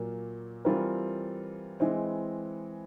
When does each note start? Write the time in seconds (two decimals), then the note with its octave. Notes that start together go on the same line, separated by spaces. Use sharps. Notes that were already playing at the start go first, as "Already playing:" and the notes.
Already playing: A#2 F#3 A#3
0.65 E3 G3 C4 F4 A#4
1.80 E3 G#3 C4 E4